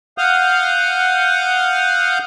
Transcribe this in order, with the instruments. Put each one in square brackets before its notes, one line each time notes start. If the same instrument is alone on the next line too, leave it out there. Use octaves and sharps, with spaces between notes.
[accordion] F5 F#5 D#6 F6 G6